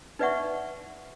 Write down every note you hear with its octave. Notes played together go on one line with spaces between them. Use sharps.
D#4 B4 D5 E5 F#5 C#6